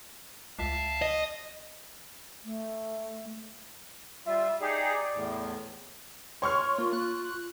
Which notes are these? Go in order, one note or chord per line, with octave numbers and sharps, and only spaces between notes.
C#2 E5 F5 A5
D#5
A3
G3 F4 E5
D#4 G4 G#4 D5
E2 A2
C#5 C6 C#6 F6
A#3 F4
F#6